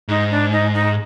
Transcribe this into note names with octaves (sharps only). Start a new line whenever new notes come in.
G#2 D#4
D4
D#4
D#4